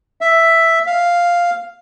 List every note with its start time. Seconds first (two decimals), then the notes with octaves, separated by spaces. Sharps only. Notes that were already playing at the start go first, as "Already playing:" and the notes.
0.21 E5
0.87 F5